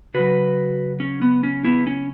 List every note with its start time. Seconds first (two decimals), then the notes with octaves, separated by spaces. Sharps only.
0.14 C#3 F#3 F#4 B4
1.00 C#4
1.22 B3
1.43 C#4
1.65 B3 E4
1.87 C#4